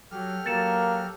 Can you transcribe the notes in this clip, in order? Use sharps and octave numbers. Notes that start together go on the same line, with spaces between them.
F#3 G4 A4 F6
F#3 A#3 A6 C#7 E7